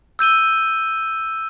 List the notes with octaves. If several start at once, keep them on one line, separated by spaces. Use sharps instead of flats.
E6 G6 D#7 G7